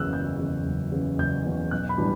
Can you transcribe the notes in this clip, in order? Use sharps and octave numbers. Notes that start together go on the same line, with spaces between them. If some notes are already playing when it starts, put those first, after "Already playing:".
Already playing: F#1 E2 C#3 E6 F#6
F#1 G6
E2 C#3
F#1
E2 C#3
F#1 G6
E2 C#3
B1 F#6
B5
A2 E3 G3 D4